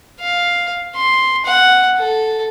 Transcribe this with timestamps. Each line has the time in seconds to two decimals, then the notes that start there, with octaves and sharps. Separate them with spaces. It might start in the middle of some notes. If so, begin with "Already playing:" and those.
0.20 F5
0.96 C6
1.45 F#5
1.98 A4